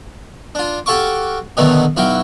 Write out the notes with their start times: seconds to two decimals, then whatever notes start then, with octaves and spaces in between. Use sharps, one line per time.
0.55 D4 F4
0.86 F#4 G4 A4 F5 C#6 D6
1.57 B2 D3 D#3 F#3 A3 B3
1.97 B1 E4 F#4 F5 G5